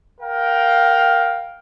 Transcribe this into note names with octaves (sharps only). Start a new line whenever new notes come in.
A#4 F5 G5